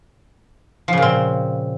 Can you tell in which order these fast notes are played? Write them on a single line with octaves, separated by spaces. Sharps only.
F3 C#3 A#2 C4